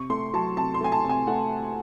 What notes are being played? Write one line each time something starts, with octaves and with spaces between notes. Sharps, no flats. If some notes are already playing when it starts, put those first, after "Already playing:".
Already playing: C3 C#6
A3 C6
F#3 A5
C3 A5
C6
A3 G#5
A5
C3
G#5
A3 F#5